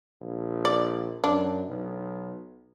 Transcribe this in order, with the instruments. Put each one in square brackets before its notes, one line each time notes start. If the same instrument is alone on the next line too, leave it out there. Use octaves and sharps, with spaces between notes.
[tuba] A#1
[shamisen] D5
[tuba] F#2 [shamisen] D4
[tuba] B1